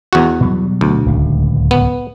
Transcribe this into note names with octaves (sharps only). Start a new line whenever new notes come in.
E2 F#4
B2 F#3 G3
D2
D1 C#2
B3